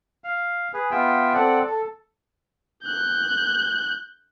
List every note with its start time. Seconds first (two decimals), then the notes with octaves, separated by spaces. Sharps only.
0.24 F5
0.73 G#4 B4
0.91 B3 F4 E5 G5
1.34 C4 A4 D5 F#5
1.67 A4
2.84 F#6 G6